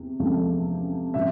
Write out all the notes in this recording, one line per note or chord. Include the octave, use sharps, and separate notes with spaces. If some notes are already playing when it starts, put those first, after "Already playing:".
Already playing: E2 C3
E2 C3 F3 A3
C3 F3 E5